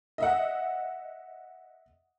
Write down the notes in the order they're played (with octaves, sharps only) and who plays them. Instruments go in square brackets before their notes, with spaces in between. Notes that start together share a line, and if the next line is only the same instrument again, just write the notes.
[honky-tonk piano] D#5 E5 F#5